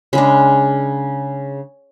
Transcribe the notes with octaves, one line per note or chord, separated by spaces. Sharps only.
C#3 G#3 D4 B5